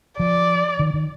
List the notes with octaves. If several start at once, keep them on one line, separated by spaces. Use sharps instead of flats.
F3 D5
D#3
D#3